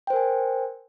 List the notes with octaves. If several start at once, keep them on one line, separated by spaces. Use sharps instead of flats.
A#4 C5 G5 G#5